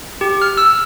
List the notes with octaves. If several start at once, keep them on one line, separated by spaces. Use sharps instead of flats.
G4
F6
E6